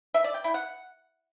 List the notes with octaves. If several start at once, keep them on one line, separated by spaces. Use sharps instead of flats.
E5
D5
G5
E4
F#5